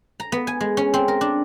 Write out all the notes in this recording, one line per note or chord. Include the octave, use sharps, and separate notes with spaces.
A#5
B3
G#5
G#3
C#4
C4
A#4
D4